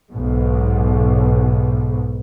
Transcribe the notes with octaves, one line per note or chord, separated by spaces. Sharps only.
B1 G#2 B2